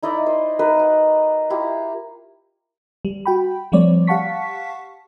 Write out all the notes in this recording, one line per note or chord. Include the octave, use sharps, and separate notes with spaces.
D#4 E4 D5 D#5
C5
D#4 A#4 B4
F#5
E4 F4 G4
G3
F#4 G5 B5
F3 G3 A3 C4 C#5 D5
G4 F5 F#5 A5 C#6 B6